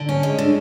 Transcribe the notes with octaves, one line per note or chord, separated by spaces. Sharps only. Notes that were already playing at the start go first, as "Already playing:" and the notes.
Already playing: D3
C#4
G#3
D3